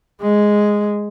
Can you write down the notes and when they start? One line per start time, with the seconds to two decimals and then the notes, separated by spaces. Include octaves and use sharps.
0.22 G#3